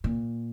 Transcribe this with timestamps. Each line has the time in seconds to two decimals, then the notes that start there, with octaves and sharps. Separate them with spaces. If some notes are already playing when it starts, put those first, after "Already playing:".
0.04 A#2